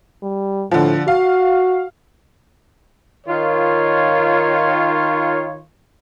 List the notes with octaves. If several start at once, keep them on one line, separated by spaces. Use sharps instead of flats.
G3
A2 D3 F3
F#4 F5
D#3 F4 C#5